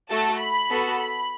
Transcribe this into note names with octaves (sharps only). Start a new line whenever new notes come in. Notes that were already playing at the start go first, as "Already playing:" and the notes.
A3 F#4 A4 A5
B5
B3 F#4 A4
B5